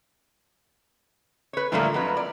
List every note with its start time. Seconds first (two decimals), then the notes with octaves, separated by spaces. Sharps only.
1.53 B4 C#5
1.72 A2 D3 F3 G3 A3 A#3
1.94 F2 F#3 B4
2.17 D5